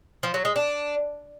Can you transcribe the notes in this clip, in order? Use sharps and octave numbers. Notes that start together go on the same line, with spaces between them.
F3
F#3
G#3
D4